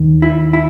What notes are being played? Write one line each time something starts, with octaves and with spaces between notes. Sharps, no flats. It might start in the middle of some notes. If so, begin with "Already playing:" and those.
Already playing: D#2 D#3
E4
E4